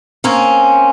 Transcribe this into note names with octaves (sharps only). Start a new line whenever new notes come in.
A#3 C4 C#4